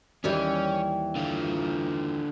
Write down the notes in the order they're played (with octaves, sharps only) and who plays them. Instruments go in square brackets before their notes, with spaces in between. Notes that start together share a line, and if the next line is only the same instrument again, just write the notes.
[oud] D#2 E3 G3 [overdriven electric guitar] C#4
[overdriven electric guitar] D3 F4